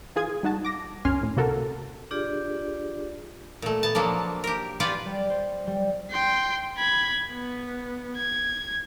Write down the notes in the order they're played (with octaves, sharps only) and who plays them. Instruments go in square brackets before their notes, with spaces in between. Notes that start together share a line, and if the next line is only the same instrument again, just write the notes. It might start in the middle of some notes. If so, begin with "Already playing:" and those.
[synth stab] E3 F4 G#4 D#6 G#6
G3 D#4 F#4 A5
D6 A#6
C#2 F#2 C#4 G#5 C6 F6
A2
C3 A#3 F#4 A4 A#4
[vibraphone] D4 F4 G4 G#4 D5
[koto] A#2 A3
B3 A5
F3 F#3 A#3 D4
G4 A#4
F4 G4 B4 D5 F#5 G#5
[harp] G3
C5
G3
[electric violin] G5 C6
B5 G#6
B3
G#6